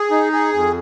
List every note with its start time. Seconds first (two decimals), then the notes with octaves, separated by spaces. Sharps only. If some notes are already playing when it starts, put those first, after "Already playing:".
Already playing: G#4
0.11 D#4
0.32 G#4
0.53 F2